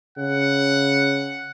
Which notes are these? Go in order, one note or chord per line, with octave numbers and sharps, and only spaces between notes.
C#3 F#5